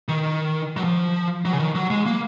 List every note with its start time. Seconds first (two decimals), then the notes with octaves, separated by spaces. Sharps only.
0.08 D#3
0.77 F#3
0.84 F3
1.45 F#3
1.53 C#3
1.59 D#3
1.75 F#3
1.90 G#3
2.05 A#3